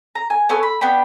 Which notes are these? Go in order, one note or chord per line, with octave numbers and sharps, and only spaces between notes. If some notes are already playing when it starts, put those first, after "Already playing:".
A#5
G#5
B3 C#4 A4 G#5
B5
B3 D4 G5 B5